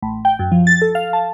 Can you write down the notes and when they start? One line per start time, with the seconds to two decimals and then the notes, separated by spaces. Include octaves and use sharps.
0.02 A1
0.25 G5
0.39 F#2
0.52 F3
0.67 A6
0.82 A4
0.95 F5
1.13 A5